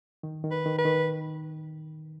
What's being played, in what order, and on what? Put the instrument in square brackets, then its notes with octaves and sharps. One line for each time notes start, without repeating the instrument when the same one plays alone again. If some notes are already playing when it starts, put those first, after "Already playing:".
[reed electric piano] D#3
D#3
[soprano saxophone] B4
[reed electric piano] D#3
[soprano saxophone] B4
[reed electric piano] D#3